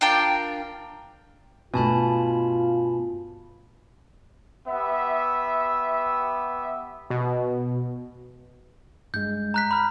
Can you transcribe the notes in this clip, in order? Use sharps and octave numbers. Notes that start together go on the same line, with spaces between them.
D4 F4 A#4 G5
G2 B2 A3 F4 G#5 A5 B5
B3 G4 E5
B2
G2 G#3 G6
A#5 F#6 B6
B5 F6